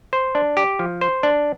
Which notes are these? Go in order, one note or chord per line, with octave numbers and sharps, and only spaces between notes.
C5
D4
G4
F3
C5
D4